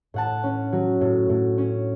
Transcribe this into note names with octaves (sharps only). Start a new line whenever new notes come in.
A2 F#5 A5
C#4
F#3
A2
A2
C#4